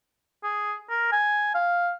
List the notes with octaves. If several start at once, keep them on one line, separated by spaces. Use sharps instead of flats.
G#4
A#4
G#5
F5